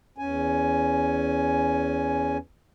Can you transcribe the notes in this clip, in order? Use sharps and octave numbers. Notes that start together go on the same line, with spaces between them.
E2 C#4 G#5